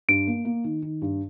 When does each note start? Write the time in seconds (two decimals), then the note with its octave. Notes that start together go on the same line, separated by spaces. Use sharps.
0.08 G2 D7
0.27 A#3
0.45 A#3
0.64 D#3
0.82 D#3
1.02 G2